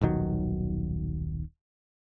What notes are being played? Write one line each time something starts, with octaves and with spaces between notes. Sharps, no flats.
D#1 B1 D#3 F#3